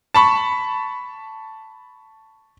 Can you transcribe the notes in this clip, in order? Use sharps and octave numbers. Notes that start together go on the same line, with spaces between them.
A5 B5 C#6